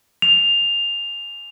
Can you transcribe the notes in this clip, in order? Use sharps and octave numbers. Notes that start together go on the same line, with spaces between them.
F7